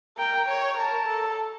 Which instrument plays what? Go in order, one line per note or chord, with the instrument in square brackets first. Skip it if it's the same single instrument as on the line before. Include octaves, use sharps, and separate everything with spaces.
[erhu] A#4 [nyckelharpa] G5
[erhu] C#5
[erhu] A#4 [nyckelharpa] A5
[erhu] A4